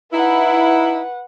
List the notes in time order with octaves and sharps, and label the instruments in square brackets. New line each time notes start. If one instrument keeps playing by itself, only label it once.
[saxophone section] D#4 E4 [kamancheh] B4 F#5